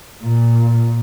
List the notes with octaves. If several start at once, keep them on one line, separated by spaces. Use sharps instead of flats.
A#2